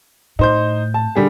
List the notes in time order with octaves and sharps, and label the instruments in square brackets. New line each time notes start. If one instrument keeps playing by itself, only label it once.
[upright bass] A2 [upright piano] D#4 C5 G6
[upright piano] A5
D3 G3 G#4